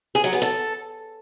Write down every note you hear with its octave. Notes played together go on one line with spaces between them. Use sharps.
G#4
F#3
B3
A4